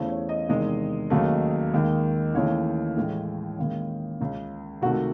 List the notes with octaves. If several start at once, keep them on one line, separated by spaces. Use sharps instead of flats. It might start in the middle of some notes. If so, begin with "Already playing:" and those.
Already playing: E2 C#3 E3 A3 C5
C#5
D#5
E2 C3 D#3 G#3 D#5
D#2 C#3 F#3 A3
D#2 D#3 G#3
D#2 C#3 E3 A3 C#5
A2 E3 G#3
D#2 C#3 G#3
C#2 C#3 G#3
C#2 C3 D#3 A3 F#4